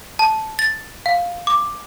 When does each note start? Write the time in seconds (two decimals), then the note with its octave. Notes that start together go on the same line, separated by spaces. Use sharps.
0.19 A5
0.59 A6
1.06 F5
1.47 D6